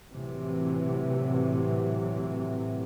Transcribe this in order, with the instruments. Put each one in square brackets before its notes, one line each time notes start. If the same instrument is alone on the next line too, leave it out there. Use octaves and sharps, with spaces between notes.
[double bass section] A2 C3 E3 F#3